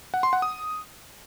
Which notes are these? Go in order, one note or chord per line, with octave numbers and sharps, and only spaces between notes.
F#5
C6
F#5
D#6